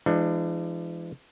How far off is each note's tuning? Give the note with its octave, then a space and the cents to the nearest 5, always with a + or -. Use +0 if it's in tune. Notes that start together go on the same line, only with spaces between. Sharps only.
E3 +45 G#3 +5 D4 +25